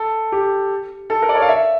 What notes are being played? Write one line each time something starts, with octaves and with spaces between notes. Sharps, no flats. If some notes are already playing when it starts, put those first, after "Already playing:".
Already playing: A4
G4
A4
A#4
D5
C#5
F5
E5